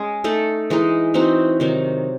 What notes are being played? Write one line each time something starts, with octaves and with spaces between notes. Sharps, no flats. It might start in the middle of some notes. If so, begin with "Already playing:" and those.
Already playing: G#3 C#4 G#4
A3 D#4 A4
E3 G#3 D#4
E3 C4 D#4 F#4
C3 D#3 F#3